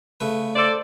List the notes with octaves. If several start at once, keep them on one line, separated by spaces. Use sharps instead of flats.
C#3 A3 B4
A4 C5 D5